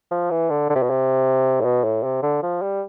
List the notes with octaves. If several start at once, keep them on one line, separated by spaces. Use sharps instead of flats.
F3
E3
D3
D3
C3
B2
C3
A2
B2
A2
C3
D3
F3
G3